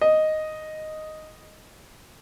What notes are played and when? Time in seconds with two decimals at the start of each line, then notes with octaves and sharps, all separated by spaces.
0.01 D#5